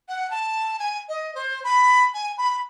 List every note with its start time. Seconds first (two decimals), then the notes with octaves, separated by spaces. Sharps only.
0.08 F#5
0.30 A5
0.79 G#5
1.09 D#5
1.35 C5
1.64 B5
2.14 G#5
2.38 B5